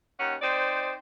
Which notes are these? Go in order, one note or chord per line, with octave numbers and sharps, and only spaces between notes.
D#2 C#4 F#5
C4 D#4 C5 D5